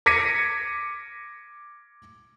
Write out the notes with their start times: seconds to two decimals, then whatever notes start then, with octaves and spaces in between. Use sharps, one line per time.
0.06 D6 G#6 A#6 B6 C#7 D#7